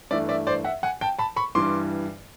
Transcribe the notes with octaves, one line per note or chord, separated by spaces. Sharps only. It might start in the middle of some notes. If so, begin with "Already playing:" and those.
G2 E3 A3 D5 E5
D5 E5
C5 D5
E5 F#5
F#5 G#5
G5 A5
A5 B5
B5 C#6
G2 E3 G3 C6 D6